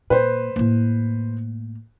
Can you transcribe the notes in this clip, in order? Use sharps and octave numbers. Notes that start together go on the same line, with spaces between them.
A#2 B4 C5
A2 A#3